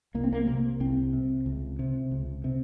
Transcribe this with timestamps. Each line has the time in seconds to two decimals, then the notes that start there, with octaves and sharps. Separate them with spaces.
0.14 C2 A#3
0.24 C4
0.33 A#3
0.47 C3 A#3
0.80 C2 C4
1.13 C3
1.46 C#2
1.79 C3
2.11 C#2
2.44 C3